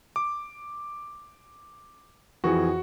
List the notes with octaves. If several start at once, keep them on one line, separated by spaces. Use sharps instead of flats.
D6
F2 E3 F#4 G#4 C#6